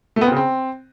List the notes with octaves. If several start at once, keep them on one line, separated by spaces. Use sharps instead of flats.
A3
B3
C4
C#3
C4